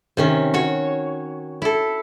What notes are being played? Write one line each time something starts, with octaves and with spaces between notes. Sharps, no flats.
C3 D#3 C#4
F#4 C#5
E4 A4